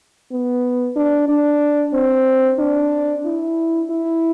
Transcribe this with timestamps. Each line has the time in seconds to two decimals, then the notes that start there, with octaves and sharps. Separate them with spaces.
0.31 B3
0.96 D4
1.29 D4
1.94 C4
2.59 D4
3.25 E4
3.90 E4